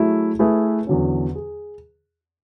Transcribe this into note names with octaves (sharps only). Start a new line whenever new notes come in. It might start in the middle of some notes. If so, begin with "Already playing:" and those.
Already playing: F#3 A3 E4 G#4
A3 E4 G#4 B4
E2 D3 F#3 C#4
G#4